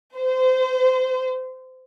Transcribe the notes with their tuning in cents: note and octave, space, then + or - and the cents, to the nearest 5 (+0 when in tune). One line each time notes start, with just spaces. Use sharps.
C5 -25